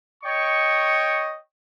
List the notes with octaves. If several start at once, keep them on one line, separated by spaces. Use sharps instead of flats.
C#5 D#5 G5 C#6